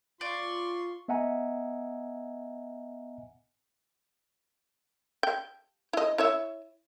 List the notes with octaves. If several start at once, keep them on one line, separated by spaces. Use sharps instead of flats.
F4 D5 C6 C#6
B3 D#5 E5 F#5 G#5 A#5
G5
E4 D#5
E4 C#5 E5